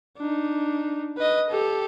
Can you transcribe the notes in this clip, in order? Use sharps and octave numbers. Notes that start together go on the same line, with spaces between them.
D4 D#4
B4 D#5
G4 A4